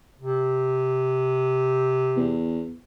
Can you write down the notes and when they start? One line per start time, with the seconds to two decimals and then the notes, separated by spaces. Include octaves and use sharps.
0.19 C3
2.16 E2